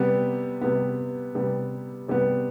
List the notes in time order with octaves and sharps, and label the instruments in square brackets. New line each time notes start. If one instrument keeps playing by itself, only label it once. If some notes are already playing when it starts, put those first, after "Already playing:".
Already playing: [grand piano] C3 G3 B3
C3 G3 B3
C3 G3 B3
C3 G3 B3